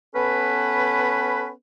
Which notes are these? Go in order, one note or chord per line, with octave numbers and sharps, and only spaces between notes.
B3 C#4 A4 B4